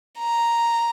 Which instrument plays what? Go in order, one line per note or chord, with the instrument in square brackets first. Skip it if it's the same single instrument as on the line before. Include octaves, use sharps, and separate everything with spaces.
[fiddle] A#5